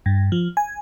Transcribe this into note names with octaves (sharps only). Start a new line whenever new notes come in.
G2
F3
G#5